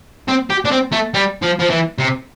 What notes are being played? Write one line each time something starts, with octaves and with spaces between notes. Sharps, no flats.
C4
G4
D4
C4
A3
G3
F3
F3
E3
C3